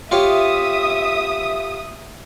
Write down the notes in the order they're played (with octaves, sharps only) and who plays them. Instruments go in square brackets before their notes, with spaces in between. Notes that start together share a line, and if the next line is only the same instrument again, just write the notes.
[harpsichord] F4 G4 C#5 [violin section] E5 D#6